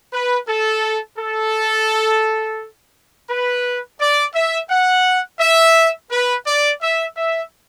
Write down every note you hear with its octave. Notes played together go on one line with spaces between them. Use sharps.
B4
A4
A4
B4
D5
E5
F#5
E5
B4
D5
E5
E5